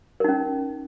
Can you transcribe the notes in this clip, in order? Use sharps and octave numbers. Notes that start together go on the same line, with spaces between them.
C#4 D#4 A#4